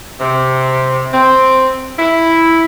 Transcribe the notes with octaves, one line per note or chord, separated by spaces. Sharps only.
C3
C4
E4